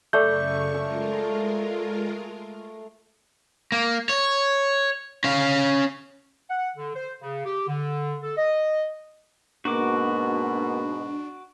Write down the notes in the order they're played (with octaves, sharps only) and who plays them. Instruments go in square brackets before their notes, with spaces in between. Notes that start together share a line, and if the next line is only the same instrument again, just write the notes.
[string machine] F#2 C#3 C#6 [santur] A3 [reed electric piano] D5 G6
[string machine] G#3 F4 A#4 [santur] E6
[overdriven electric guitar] A#3
C#5
C#4 F5
[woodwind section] F#5
D3
C5
C#3
G4
D3
A4
D#5
[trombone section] G#2 B2 [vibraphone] A#3 A#4 B4 [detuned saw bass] D4 [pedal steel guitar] F#4 D6